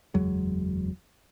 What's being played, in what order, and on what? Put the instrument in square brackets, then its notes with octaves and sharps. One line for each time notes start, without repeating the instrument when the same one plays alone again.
[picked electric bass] F#1 E2 F#3 G#3